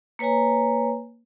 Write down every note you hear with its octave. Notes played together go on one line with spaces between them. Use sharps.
A#3 B4 C#5 G#5 A#5